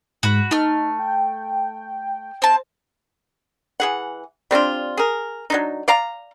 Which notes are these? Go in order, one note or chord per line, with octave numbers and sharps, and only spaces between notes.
G#2 F#4 B5
A3 D#4 F6
G5
C4 C5 A5
E3 G#4 F#5
G3 C4 D4 F4
G#4 A#4
F#3 D4 D#4
D5 F5 A#5